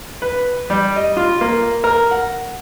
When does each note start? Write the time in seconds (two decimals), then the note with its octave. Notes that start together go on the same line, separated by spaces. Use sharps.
0.22 B4
0.70 G3
0.96 D#5
1.17 F4
1.41 A#3
1.84 A#4
2.11 F#5